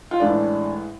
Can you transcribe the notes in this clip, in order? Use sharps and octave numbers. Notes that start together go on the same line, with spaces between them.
F4
A1 A2 G#3 D4